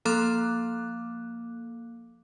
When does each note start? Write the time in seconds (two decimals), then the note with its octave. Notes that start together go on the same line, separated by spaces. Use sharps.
0.05 F3 A#3 A4 F5 D6 F#6